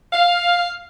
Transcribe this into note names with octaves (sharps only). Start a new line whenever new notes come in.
F5